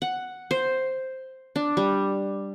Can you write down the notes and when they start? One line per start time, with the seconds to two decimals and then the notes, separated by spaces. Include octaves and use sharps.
0.02 F#5
0.51 C5
1.56 D4
1.77 G3